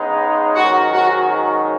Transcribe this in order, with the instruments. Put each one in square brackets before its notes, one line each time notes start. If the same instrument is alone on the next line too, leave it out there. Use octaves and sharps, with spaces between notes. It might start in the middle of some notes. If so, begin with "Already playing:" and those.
Already playing: [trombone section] C#3 G#3 B3 D#4
[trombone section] G#2 D#3 F#3 C#4 [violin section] F#4
[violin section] F#4